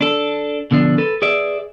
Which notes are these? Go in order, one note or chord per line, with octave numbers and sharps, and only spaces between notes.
D4 A4
B2 D3 F3 D4
A4 B4
G#4 B4 D5 E5